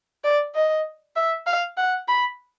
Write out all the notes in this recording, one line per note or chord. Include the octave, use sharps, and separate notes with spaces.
D5
D#5
E5
F5
F#5
B5